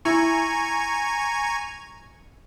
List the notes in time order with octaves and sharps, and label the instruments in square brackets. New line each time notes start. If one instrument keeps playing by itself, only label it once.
[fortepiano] E4 [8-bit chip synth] G#5 A#5 C#6